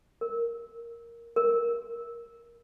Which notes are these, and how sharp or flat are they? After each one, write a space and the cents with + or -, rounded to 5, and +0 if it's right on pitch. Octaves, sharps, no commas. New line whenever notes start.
A#4 +0
A#4 +10